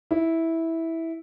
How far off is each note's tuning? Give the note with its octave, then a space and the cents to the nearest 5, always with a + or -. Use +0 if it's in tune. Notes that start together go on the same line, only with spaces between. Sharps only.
E4 -10